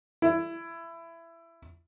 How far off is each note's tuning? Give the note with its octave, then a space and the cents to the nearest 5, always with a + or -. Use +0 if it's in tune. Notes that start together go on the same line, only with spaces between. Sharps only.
E4 +20